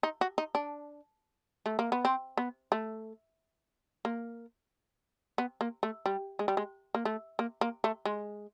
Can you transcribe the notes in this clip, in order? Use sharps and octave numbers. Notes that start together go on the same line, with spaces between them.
D#4
F#4
D#4
D4
A3
A#3
B3
C4
B3
A3
A#3
B3
A#3
A3
G3
G#3
G3
G#3
A#3
A3
A#3
A#3
A3
G#3